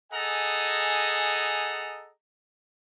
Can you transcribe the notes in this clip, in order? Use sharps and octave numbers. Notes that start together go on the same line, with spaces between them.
G#4 A4 D#5 F#5 G#5 A#5